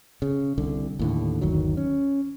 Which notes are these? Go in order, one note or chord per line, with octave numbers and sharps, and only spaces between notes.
C#3
C2 D3
D#2 A2 D3
G1 D#2 D#3 F#3
C#4